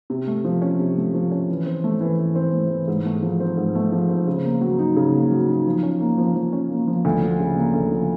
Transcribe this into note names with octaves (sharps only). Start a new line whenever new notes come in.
C3
A3
F3
C#4
C3
A3
F3
C#4
E3
C4
A3
E3
E3
C4
A3
E3
G#2
A3
F3
C4
G#2
A3
F3
C4
C#3
A#3
F#3
D#4
C#3
A#3
F#3
D#4
F3
C#4
A#3
F3
F3
C#4
A#3
F3
D2
F3
C#3
A#3
D2
F3